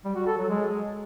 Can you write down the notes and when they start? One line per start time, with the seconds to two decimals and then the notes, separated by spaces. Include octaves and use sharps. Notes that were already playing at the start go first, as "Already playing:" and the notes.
0.05 G3
0.16 F#4
0.27 A4
0.38 F#3
0.49 G#3